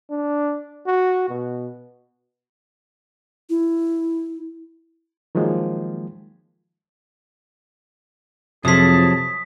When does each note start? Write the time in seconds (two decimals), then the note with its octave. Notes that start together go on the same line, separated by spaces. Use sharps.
0.11 D4
0.87 F#4
1.29 B2
3.50 E4
5.35 D#3 F3 F#3 G#3 A#3
8.65 F2 C3 F3 F#3 G#4 A5 D#6 B6